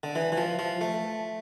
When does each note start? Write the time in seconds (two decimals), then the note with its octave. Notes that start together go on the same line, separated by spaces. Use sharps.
0.03 D3
0.15 E3
0.32 E3
0.37 F3
0.59 F3
0.81 A3